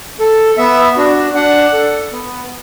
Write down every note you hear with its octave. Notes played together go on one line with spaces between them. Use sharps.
A4
B3 E5
D4 F#4
D4 F#5
A4
B3